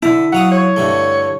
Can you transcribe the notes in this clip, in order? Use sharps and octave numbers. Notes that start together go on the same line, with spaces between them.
D3 E4 A5
F#3 F5 F#5 D#6
C#5
G2 D3 A3